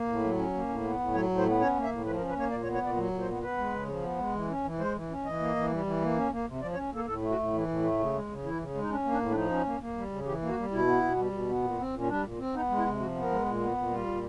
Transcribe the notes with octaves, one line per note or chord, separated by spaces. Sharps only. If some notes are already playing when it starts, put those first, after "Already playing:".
Already playing: A#3
A2
F#3
C#4
A#3
A2
B3
A2
F#3 C#5
A2
C5
B3
C#4 C#5
A#3
E5
A2
F3 B4
A#4
C#4
B4
A#3 C#5
A#2 D5
C#5
B3
C#5
A#2 D5
F#3
A#2
C5
B3
B3 B4
G#3
C#3
F3
B3
G#3
E3
C#4
E3
G#3 C5
E3
C#4
E3 D#5
A#3
E3
G3
E3
A#3
C#4
A#3
C3
F3 D5
C#5
C#4
A#3 A4
A2 A4
A3
F#4
A2
E3
A2
A3
C#3
G#3
C#3
E3 E4
C#3
G#3
D#4
C#4 D4
A#3
D4
A2
D4
F3 D#4
C#4
A#3
A#3
G3
C#3
E3 G4
A#3
F#4
G3
B2 E4
B3
B2
G3
B2
B3
A#2
C4
A#2
C#4
G3 D4
A#2
C4
B3 D#4
G#3
E4
C3
F3 F#4
B3
A#4
G#3
A#2
B3
A#2
G3 F4
A#2